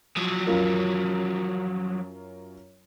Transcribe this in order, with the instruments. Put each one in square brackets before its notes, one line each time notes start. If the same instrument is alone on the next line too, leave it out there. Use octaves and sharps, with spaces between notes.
[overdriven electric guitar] F3 F#3
[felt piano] F#2 F4 A#4